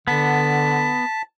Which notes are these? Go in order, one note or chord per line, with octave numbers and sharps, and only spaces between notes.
D3 B3 A5 B6